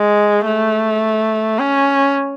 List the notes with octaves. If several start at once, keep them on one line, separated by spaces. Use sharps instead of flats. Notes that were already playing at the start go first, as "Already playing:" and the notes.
Already playing: G#3
A3
C#4